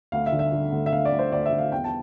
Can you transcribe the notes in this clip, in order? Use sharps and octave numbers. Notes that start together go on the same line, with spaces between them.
D2 F5
E5
D3
E5
D3
D2
E5
D2 F5
D5
D2
C5
D2 D5
E5
D2
F5
E2 G5
A5